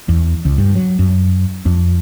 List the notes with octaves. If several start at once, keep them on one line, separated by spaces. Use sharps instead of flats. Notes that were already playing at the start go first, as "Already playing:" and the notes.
E2
C#2
G2
F#3
F#2
F2